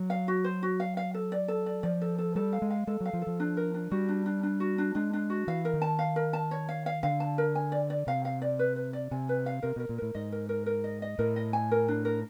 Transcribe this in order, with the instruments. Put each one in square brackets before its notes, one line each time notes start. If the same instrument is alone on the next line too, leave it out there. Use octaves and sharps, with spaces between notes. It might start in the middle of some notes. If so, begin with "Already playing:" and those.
Already playing: [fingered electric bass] F#3
[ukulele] F5
F#4
C5
F#4
F5
F5
A4
D5
A4
D5
[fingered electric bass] F3 [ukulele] D5
[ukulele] A4
A4
[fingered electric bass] G3 [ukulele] A4
[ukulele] F5
[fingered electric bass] G#3
[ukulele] F5
[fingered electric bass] G#3 [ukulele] A4
[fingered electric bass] F#3 [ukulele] F5
[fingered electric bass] F3
[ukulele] A4
[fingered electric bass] F3
[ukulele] D4
A#4
D4
[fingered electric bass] G3 [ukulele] F#4
[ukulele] D4
D4
D4
F#4
D4
[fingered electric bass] G#3 [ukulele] D4
[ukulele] D4
F#4
[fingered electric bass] E3 [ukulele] F5
[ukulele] A#4
[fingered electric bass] D#3
[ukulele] A5
F5
A#4
A5
C#5
F5
F5
[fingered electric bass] D3 [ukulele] F5
[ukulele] A5
A#4
G#5
D5
D5
[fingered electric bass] C3 [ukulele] F5
[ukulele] F5
D5
B4
B4
D5
[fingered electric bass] C3 [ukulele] G#5
[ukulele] B4
F5
[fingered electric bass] C3 [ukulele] A#4
[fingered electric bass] B2 [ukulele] A#4
[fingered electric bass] A#2
[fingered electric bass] A2 [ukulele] A#4
[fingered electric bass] G#2 [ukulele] D#5
[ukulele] A#4
A#4
A#4
D#5
D#5
[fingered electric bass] A2 [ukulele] A#4
[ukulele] D#5
G#5
A#4
D4
A#4